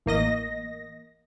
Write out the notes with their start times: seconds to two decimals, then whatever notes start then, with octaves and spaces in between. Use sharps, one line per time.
0.06 A1 A#3 D#5 A#6